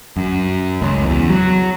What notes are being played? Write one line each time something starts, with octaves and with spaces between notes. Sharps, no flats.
F#2
C#2
E2
F#3